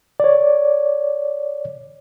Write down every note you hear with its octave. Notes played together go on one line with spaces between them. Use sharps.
C#5 D5